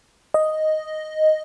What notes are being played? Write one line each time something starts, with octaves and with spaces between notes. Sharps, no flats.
D#5